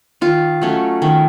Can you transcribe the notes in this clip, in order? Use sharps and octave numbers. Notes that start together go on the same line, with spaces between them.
D#3 F4
F#3 A3 C#4
D#3